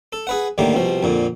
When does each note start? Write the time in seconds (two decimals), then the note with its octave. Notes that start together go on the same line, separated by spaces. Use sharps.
0.13 A4
0.27 G#4 B4 F#5
0.58 D#2 A2 D3 D#3 G3 A#3
0.74 C2 B2 F3
1.03 F2 A#2 D3